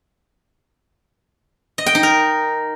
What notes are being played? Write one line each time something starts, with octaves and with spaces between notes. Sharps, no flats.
D#5
G5
D#4
A#4